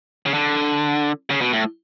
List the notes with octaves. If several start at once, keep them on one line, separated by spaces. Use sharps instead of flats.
C#3
D3
C#3
B2
A2